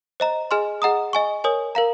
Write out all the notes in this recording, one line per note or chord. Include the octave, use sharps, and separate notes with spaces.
C5 D#5 A#5
G#4 D#5 G#5 C6 F6
G#4 D#5 F#5 A#5 D#6
D#5 G#5 C#6
A#4 C#5 G#5 D#6
A#4 F5 A#5